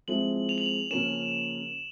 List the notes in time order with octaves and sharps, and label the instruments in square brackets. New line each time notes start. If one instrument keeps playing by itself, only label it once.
[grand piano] F3 G#3 C4 E4 [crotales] F#7
[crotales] F7
F#7
F7
[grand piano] C#3 F3 A#3 C#4 [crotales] E7